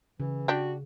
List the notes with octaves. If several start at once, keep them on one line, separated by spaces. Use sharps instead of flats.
C#3 E3
D4 F#4 G4